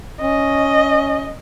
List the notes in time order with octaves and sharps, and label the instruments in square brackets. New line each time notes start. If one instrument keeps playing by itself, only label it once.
[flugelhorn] C#4 [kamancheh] D#5